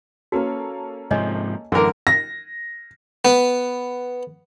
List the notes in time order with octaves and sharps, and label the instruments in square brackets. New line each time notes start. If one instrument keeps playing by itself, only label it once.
[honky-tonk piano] A#3 C#4 A4 [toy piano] F#4 B4
[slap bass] G#2 C3 F3 [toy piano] C#5 D#5 G#5
[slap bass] F#2 A2 [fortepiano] D3 A#4 [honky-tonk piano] E3 [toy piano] F#5 D6
[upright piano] A#6
[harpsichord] B3